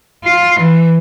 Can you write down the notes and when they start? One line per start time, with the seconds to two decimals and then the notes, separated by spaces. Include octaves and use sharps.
0.24 F4
0.59 E3